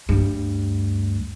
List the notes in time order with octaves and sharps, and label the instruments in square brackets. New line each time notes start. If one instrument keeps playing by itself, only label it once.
[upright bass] D2 G2